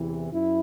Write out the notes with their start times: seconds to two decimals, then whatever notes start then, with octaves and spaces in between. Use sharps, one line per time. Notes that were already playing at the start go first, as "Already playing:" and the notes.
Already playing: E2 C3 E3
0.32 F#2 E4